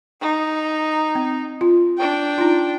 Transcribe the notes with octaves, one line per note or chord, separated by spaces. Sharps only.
D#4
C4
F4
D4 G5
D#4 F4